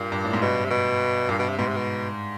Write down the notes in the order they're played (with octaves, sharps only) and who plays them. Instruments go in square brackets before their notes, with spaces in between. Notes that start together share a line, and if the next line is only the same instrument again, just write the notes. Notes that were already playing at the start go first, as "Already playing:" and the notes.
Already playing: [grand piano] G2 [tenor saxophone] A#2
[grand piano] G2
A2
G#2
[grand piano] G2 [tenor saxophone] B2
[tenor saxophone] C3
B2
[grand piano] G2 [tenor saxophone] A#2
[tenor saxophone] B2
C3
[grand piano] G#2 [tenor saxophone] B2
[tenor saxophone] C3
B2